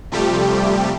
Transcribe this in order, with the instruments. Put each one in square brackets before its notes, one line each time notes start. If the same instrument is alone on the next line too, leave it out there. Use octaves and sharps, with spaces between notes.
[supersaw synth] C3 F3 G3 A3 G4